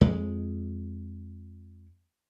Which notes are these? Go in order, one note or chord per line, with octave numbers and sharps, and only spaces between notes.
F2 G#3